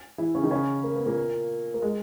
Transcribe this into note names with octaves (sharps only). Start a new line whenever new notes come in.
E3 E4
C#3 C#4
D#3 D#4
C#3 C#4
A#3
B3
A#2 A#3
A#3
G#3